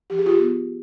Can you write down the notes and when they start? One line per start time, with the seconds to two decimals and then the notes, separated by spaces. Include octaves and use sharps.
0.10 F3 G4
0.19 G#4
0.26 F4 G4
0.39 B3